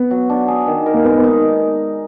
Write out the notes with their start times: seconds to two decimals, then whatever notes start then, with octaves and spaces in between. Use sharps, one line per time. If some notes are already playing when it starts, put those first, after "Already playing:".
Already playing: B3
0.11 F#3
0.29 D4
0.48 G#4
0.67 D#3
0.86 A#4
0.94 A#3
1.05 G#3 B3
1.18 B3
1.24 D#4